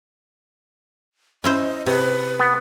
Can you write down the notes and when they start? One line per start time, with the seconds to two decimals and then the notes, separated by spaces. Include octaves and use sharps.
1.44 C#4 E4 C5 D#5
1.86 C3 B4
2.39 B3